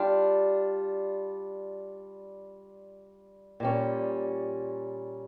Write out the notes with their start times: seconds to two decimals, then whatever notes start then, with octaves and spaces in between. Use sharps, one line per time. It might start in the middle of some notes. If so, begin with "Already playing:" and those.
Already playing: G3 D4 F4
3.60 A#2 G3 C#4